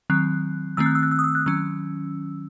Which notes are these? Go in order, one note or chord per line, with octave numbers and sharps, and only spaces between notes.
D#3 F#3 C4 F#6
D#3 A3 C4 E6
F#6
E6
F#6
E6
D#6
E6
F#6
D#3 F#3 C#4 E6